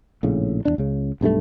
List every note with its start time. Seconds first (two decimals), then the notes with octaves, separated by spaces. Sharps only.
0.23 A#1 A2 C#3
0.65 E2 B2 D4
0.78 C#2 C#3
1.21 B1 G2 D#3 A3